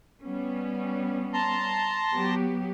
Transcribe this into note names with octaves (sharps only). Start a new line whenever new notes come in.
G3 B3 C#4
A5 A#5 C6
F#3 B3 G4